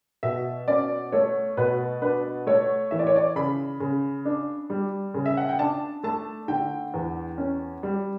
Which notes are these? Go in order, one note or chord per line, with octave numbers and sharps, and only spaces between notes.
B2 E5
C#4 D5
A3 C#5
B2 B4
D4 B4
A3 C#5
E3 E5
D5
C#5
D5
C#3 B5
C#3
D4
G3
C#3
E5
F#5
G5
D4 A5
A3 A5
D3 G5
E2
C#4
G3